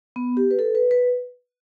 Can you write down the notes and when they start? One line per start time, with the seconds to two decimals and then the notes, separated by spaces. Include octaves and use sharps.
0.16 B3
0.37 G4
0.51 B4
0.59 A4
0.75 B4
0.91 B4